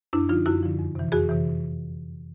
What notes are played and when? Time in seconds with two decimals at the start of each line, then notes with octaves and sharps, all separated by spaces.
0.13 F#2 D4 E4
0.29 D3 F3 D#4 F4
0.46 F#2 E4 F#4
0.63 D3 F3
0.79 F2
0.95 C3 E3
1.12 F2 F#4 G#4
1.29 C3 E3